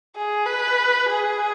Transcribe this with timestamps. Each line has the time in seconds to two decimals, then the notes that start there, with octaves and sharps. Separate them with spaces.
0.16 G#4
0.46 B4
1.09 G#4